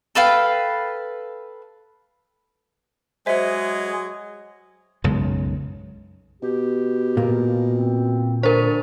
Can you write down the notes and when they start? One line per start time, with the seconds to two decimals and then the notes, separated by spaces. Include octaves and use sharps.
0.15 A4 B4 F5 G5
3.26 F#3 G#3 C5 D#5 E5 G#5
5.04 B1 F#2 C#3 G#3
6.42 B2 G4
7.17 A#2 A#3
7.69 C4
8.43 D3 A#4 C5 C#6